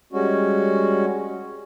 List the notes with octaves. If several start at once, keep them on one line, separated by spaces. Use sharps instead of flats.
G3 G#3 C#4 F#4